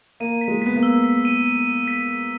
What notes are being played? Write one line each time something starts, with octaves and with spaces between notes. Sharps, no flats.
A#3 D#7
B6
G#3
B3 B6
A#3
E6
B6
D#7
D#7
D#7
B6
B6